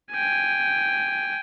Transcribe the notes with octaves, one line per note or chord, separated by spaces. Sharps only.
G5 G#5